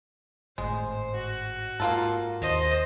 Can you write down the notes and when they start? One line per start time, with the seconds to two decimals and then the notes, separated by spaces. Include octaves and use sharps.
0.58 G#1 A2 G#3 C5
1.15 F#4
1.80 G#2 A#3 F4 A4
2.41 D#2 C5 D#5